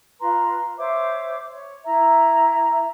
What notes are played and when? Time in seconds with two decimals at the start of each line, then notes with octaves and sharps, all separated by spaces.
0.19 F4 B4 A#5 C6
0.77 C5 C#5 E5 D6
1.53 C#5
1.85 E4 E5 A#5